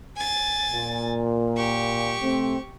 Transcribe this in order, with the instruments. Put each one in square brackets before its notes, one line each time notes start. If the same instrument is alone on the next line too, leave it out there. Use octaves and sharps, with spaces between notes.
[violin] G#5 A6
[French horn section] A#2
[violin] G4 C#6
[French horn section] C3 A3 C4